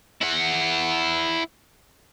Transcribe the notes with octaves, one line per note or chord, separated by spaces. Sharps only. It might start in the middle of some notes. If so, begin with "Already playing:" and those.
E4 F#5